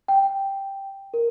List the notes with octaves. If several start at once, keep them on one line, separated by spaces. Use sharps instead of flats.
G5
A#4